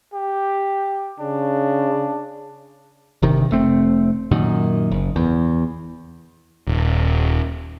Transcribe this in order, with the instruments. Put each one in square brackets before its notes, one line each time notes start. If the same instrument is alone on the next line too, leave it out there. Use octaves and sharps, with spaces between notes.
[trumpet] G4
[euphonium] C#3 [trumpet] D4
[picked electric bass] G1 C3 D#3
F1 A3 C4
F#2 A#2 D#3
F#1
E2
D#1